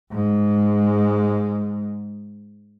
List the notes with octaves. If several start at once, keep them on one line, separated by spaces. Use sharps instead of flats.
G#2 G#3